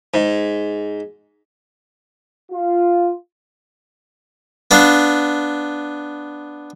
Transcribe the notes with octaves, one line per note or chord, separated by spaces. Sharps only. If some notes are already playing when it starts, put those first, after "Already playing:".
G#2
F4
B3 D4 F5